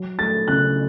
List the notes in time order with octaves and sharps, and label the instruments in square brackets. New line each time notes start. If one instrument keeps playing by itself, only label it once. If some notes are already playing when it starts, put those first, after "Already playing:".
Already playing: [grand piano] F#3
A3 A6
C#3 F#6